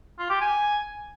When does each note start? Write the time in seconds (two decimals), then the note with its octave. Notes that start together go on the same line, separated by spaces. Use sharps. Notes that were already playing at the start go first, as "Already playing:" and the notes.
0.19 F4
0.30 G4
0.41 G#5